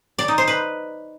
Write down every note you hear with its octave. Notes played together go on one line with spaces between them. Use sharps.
D5
D#4
C5
B4